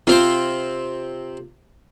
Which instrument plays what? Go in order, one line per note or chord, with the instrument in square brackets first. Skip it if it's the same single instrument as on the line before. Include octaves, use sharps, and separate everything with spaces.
[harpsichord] C3 C4 C5 [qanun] F4 F5